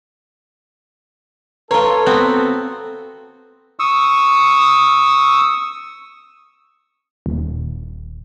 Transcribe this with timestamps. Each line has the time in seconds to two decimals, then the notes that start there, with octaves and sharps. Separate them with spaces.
1.71 F4 A4 B4 C#5 A#5
2.06 B3 C4 F#4
3.79 C#6 D#6 E6
7.26 D#1